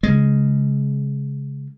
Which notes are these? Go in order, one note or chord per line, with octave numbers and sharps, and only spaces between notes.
C#3 G#3